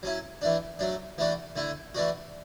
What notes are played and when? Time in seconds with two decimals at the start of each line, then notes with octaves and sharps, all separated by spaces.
0.03 F#3 C#4 E4
0.42 E3 A3 D4
0.79 F#3 A3 D4
1.18 E3 A3 D4 F#4
1.56 D3 A3 E4
1.95 E3 A3 D4 F#4